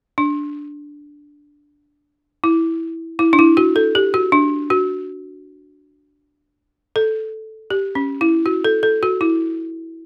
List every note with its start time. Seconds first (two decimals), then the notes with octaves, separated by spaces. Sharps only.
0.18 D4
2.44 E4
3.19 E4
3.33 D4
3.39 E4
3.57 F#4
3.76 A4
3.95 G4
4.14 F#4
4.32 D4
4.70 F#4
6.96 A4
7.70 G4
7.95 C#4
8.21 E4
8.46 F#4
8.64 A4
8.83 A4
9.03 F#4
9.21 E4